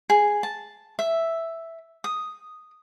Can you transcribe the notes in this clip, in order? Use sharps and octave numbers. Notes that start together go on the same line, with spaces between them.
G#4
A5
E5
D#6